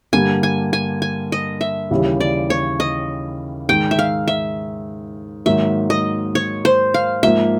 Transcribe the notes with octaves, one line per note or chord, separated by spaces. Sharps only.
G2 D3 G3 A#3 G#5
G#5
G#5
G#5
D#5
E5
D#2 C#3 E3 G3
D5
C#5
D#5
G#2 D#3 G#3 G5
E5
F5
E5
G#2 D#3 F#3 A#3 E5
D#5
C#5
C5
F5
G#2 F3 A#3 E5